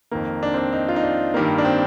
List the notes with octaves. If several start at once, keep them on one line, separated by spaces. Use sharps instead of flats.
F2 D#3 A#3
D4
C4
D4
D#4
F4
D#4
D4
G2 D#3 G3 A#3
D4
C4